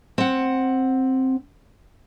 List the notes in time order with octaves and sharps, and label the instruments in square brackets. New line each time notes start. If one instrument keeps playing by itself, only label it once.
[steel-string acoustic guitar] C4 F#5